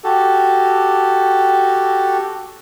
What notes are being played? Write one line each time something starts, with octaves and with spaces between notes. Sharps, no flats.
F#4 G4 A4